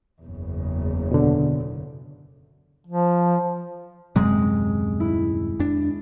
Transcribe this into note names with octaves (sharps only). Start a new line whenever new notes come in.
F#1 E2 C#3
B2 D3
F3
D#1 F#2 C3 G#3
E4
F2 D4